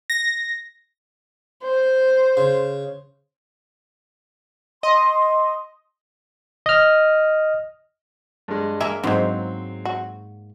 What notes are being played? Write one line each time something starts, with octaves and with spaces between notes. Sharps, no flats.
A#6
C5
C#3
D#5 C6
D#5 F6
G2 G#3
A#3 G#4 A#4 E5
G#2 F#3 G#3 B3 C4
F#4